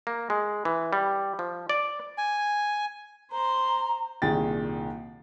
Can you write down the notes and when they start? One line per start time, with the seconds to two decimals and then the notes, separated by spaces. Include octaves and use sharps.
0.07 A#3
0.30 G#3
0.65 E3
0.93 G3
1.39 F3
1.69 D5
2.18 G#5
3.32 C5 A#5 C6
4.22 C2 A#2 D#3 G#4 G5 A6